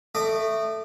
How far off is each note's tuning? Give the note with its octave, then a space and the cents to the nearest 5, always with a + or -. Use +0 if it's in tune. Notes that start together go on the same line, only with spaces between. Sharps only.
A3 +5 D#5 -30 D6 +0